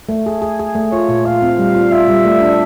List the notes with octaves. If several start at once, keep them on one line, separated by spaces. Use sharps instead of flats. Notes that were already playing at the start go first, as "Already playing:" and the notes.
A3
G#4
G#4
G#4
A3
F4 C#5
A#2
F4 F5
C4
G3
F4
F4 E5
G3
A3
D4